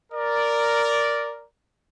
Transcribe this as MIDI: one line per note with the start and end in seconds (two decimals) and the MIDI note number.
0.12 1.44 70
0.12 1.44 74